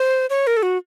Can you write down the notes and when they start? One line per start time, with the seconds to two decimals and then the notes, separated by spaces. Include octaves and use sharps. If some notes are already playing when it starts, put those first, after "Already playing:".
Already playing: C5
0.30 C#5
0.47 A#4
0.57 A4
0.63 F#4